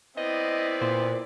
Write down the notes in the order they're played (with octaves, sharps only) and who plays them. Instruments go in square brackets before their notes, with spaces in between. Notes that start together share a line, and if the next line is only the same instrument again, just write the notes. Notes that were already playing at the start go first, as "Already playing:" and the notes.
[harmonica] B3 C4 [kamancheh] E4 D5 [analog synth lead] D#5
[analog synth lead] A#2 [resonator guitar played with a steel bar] C5